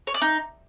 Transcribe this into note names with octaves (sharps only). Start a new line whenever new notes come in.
C#5
D5
D#4